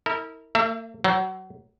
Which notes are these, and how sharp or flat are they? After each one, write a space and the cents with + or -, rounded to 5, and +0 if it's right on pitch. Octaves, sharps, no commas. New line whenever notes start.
E4 -35 A#4 -30
A#3 -45 E5 +20
F#3 +25 C5 +0